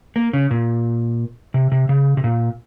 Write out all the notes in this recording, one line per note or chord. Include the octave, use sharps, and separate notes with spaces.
A#3
C#3
A#2
C3
C3
C#3
C3
A#2